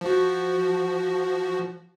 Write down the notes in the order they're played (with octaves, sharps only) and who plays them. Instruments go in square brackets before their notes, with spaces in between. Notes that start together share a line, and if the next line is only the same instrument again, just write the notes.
[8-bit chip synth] F3 F#4